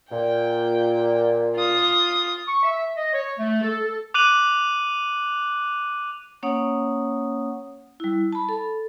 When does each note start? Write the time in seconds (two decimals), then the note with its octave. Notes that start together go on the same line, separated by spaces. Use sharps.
0.11 A#2 G5
1.55 F4 D#6
2.48 C#6
2.63 E5
2.97 D#5
3.13 C#5
3.38 A3
3.62 A4
3.81 A4
4.14 D6 F#6 D#7 F#7
6.43 A#3 C#4 C#5 F#5 D#6
8.00 G3 E4
8.33 A5 B5
8.49 A4